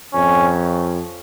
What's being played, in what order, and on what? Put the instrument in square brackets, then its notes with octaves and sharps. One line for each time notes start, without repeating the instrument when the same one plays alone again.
[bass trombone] F2 [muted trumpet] C#4